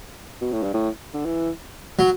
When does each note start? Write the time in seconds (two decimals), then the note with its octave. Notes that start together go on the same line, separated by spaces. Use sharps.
0.41 B2
0.52 A2
0.63 G2
0.74 A2
1.14 D3
1.25 E3
1.99 F#3